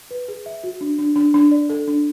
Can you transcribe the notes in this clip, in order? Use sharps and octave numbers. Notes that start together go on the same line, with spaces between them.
B4
G#4
E5
F#4
D4
D4
D4
D4
D5
A4
D4